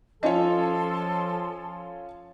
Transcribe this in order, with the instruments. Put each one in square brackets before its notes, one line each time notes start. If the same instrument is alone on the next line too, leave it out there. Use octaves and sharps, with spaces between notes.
[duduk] F3 [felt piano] C#4 F4 C#5 [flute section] A4 C6 [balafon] D#5